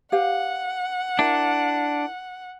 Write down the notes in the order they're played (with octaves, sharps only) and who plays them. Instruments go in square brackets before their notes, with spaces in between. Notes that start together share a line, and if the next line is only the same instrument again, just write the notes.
[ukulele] G4 B4 F5 [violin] F#5
[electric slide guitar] D4 [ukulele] E4 A#4